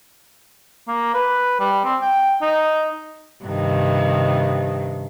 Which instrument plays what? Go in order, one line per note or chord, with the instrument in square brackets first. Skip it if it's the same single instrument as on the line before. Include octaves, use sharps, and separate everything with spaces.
[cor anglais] A#3
B4
G3
C4
G5
D#4
[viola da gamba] G2 C3 D#3